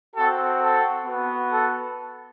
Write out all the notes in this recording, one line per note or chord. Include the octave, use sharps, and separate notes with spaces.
C4 F#4 A4
A4
B3 F#4
A4